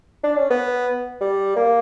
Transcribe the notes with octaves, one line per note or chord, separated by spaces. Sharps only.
D4
C#4
B3
G3
A#3